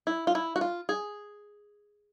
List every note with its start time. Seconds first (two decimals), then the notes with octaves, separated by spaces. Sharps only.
0.07 E4
0.27 F4
0.35 E4
0.56 F#4
0.61 F4
0.89 G#4